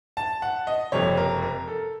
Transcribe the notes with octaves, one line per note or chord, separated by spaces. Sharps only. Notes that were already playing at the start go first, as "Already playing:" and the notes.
A5
F#5
D#5
F#1 F2 C3 C#5
A#4
A#4
A4